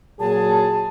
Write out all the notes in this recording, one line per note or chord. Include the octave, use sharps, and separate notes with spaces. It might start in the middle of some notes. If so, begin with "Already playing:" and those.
A#2 F#3 G#4 A5